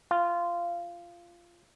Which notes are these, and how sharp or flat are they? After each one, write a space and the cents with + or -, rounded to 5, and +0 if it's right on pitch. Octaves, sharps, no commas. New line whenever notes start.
F4 -15